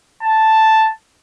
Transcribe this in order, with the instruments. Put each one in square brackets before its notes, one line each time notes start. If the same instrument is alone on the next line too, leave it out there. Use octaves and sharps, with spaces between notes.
[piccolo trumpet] A5